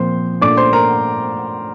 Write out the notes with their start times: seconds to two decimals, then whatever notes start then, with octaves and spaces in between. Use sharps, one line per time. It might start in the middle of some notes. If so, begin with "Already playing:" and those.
Already playing: A#2 F3 C4 C5 C6
0.41 A#2 A3 D4 D5 D6
0.57 C5 C6
0.73 A#4 A#5